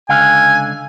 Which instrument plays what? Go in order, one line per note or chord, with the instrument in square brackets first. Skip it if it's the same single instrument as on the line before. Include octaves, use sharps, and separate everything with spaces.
[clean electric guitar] C#2 D3 F5 [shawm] G#5